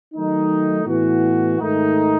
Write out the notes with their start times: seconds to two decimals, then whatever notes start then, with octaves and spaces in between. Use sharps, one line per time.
0.15 D#3 F#3 A3 D#4
0.86 A2 E3 B3 F#4
1.58 G#2 D#3 A3 D#4